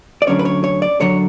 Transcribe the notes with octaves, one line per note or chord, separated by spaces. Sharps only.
D5
D2 D3 F#3 C#4 C#5
B4
C#5
C#5
D5
F#2 D3 F#3 C#5